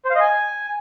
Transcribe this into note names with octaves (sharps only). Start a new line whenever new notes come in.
C5
F5
D#5
G#5